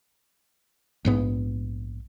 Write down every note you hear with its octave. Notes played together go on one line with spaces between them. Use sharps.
A#1 G#2 B3